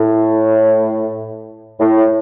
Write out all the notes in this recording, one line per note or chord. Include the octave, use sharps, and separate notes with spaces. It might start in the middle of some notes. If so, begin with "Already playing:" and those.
Already playing: A2
A2